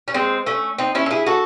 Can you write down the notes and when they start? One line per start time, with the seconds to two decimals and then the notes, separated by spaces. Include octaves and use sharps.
0.08 C#4
0.14 G#3 C4
0.46 A3 C#4
0.78 C4 D#4
0.95 C#4 E4
1.06 A4
1.11 E4 G#4
1.26 F#4 A4